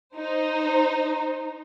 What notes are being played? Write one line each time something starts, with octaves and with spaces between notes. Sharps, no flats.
D#4 C5